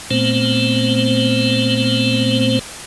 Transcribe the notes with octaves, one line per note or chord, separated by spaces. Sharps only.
A#2 A3 B3 C4 C5